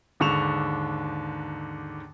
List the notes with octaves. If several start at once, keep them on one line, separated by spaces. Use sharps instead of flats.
D#2 G#2 D3 C#6 E7 F7